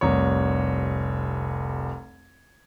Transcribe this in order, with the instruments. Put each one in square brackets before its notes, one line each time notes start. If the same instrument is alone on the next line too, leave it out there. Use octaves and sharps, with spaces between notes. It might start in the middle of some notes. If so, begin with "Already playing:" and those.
[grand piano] F1 C2 C#5